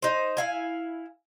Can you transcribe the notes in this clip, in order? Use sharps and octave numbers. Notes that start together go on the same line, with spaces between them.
D#4 C5
E4 F5 G#5